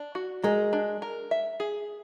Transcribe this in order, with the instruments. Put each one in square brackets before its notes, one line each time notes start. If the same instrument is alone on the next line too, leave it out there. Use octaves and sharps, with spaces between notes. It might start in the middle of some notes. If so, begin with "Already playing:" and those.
Already playing: [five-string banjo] D4
F#4
[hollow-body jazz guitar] G#3 [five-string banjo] A#4
[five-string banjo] D4
A#4
E5
G#4